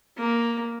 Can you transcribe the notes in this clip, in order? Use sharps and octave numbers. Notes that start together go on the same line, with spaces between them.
A#3